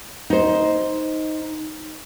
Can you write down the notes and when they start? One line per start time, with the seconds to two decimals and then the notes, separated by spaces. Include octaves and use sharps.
0.30 D#4 C5